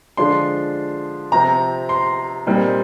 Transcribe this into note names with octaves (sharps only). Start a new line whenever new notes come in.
D3 F3 G#3 D4 F4 C6
C3 F3 C4 A#5
C6
A#2 G3 C4 D#4